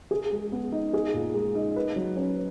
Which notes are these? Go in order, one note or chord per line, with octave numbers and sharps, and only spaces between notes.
G#4
G#3
B3
D#4
G#4
A#2
G#3
D#4
B4
F#3
C#4